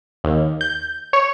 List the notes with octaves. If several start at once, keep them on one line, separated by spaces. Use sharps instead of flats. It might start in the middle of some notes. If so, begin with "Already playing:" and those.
D#2
G6
C#5